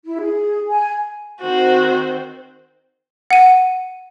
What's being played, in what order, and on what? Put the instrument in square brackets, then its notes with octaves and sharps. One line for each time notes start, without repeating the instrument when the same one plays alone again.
[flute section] E4
G#4
G#5
[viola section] D#3 C4 C5 [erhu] F#4
[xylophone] F#5 D#7